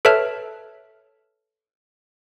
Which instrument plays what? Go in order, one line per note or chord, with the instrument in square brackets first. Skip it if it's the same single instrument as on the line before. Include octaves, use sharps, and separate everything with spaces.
[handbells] A4 B4 C#5 E5 A5 F6